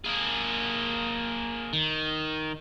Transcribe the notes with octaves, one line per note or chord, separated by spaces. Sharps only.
A#3 G#4
D#3